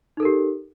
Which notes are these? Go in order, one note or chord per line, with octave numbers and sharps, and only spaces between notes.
D#4 G4 A4 A#4